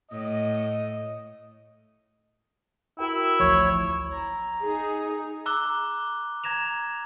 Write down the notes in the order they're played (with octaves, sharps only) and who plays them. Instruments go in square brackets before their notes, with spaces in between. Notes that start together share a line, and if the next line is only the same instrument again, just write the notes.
[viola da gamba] A2 [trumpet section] D#5
[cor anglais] E4 [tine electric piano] F#4 A#4 G5
[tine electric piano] A1 D2 F3 [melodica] C#5
[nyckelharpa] A#5
[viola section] D#4 G#4
[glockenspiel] A#5 D6 E6 F#6 G7
A#5 G#6 A#6 E7 F7